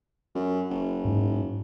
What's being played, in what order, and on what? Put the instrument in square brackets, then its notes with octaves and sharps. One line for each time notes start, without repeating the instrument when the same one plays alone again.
[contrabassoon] F#2
F#1
[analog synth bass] G#2